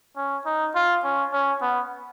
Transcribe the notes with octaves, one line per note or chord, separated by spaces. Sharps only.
C#4
D#4
F4
C#4
C#4
B3